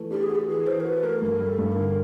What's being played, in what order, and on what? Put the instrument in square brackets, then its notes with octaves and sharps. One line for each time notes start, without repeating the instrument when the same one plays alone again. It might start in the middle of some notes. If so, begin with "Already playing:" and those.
Already playing: [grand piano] E3 A3
[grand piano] D4 [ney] G4
[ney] G#4
[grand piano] F#4
[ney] G4
[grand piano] E3 [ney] G#4
[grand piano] E3 [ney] C5
[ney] A#4
[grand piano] F#4 [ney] B4
[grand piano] A3 [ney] A#4
[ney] A4
[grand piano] G2 [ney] A#4
[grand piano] G3
[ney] A4
[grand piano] G2
[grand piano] D3 [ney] A#4